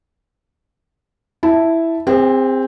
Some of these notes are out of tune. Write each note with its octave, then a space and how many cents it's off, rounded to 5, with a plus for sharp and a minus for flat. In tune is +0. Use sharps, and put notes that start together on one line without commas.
E4 +0 A5 +0
C4 +0 G#4 -40